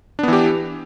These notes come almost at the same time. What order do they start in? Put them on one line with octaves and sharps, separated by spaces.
D4 B3 E3 G4